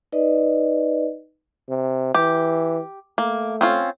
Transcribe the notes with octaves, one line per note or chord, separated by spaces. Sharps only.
D#4 B4 D5 D#5
C3
E3 G4
A3 A#3
C4 C#4 F4